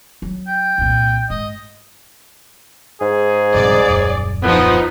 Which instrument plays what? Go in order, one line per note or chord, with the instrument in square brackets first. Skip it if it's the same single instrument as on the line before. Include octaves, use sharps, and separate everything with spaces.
[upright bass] F#3
[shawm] G5
[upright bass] C2 A#2
[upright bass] G#2 [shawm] D#5
[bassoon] G#2 [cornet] G#4
[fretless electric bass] A#1 G2 C3 [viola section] D5
[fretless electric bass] D#1 F#2
[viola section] F3 D#4 [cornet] B3